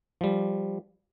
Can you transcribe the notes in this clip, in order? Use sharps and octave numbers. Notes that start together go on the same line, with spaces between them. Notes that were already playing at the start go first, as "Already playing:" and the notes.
F3 G3